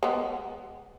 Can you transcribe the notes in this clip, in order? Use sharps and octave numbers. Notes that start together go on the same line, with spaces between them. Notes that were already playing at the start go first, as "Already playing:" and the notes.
G#3 B3